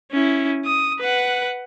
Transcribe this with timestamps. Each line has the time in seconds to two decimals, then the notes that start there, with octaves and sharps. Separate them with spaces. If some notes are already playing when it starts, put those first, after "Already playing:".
0.12 C#4 E4
0.65 D#6
1.00 B4 F#5